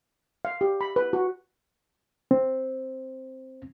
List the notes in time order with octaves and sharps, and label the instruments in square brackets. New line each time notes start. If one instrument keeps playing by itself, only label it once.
[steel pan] F5
G4
B5
B4
F#4
[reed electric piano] C4